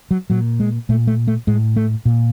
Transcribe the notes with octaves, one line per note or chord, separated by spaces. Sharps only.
F#3
A#2 F#3
G#3
A#2 A3
A3
A3
A2 G#3
A3
A#2